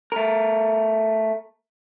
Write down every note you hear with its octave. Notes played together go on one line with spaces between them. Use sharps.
A3 A#4